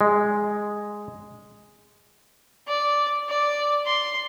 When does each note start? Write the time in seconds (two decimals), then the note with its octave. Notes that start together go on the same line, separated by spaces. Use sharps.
0.01 G#3
2.68 D5
3.30 D5
3.86 C6